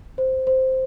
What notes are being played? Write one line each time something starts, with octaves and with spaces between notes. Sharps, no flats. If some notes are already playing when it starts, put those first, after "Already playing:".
C5
C5